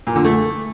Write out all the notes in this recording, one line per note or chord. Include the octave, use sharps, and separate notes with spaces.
A#2
D3
A3